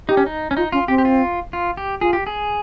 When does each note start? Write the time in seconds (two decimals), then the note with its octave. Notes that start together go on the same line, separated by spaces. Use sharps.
0.09 D#4 G4
0.17 C#4
0.26 D#4
0.51 C#4
0.57 D#4 F4
0.72 C#4 F4
0.88 C4 G4
0.98 G4
1.05 F4
1.53 F4
1.77 G4
2.01 F4 G#4
2.13 G4
2.27 G#4